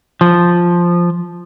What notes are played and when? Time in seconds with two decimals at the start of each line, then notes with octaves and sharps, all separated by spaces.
0.21 F3